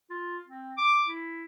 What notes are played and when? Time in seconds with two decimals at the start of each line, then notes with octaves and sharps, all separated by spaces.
0.10 F4
0.47 C4
0.78 D6
1.08 E4